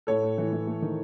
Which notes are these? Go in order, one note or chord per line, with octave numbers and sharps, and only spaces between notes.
A2 A4 C#5
A2
E3
E3
A3
D#3